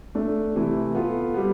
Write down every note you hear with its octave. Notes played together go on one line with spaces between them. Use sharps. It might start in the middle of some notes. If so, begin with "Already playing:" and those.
A3 D4 A4
C3 E3 A3
B3 F4 A4
G3 B3